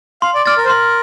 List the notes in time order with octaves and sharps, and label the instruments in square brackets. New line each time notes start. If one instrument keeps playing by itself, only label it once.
[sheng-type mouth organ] F5 [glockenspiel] C6
[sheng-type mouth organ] D5
[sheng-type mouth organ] D5 [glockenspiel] F6 A6
[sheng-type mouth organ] A#4
C5
[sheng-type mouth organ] A#4 [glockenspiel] C6